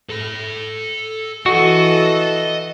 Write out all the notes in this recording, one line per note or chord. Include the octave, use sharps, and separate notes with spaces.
A4 B5
E3 F#4 A4 D#5